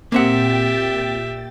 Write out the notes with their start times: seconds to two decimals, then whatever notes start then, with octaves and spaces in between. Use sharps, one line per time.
0.12 A#2 A#3 C4 G4 E5 F#5 G5 A6